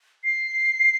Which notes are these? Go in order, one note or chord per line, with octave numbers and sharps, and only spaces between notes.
C7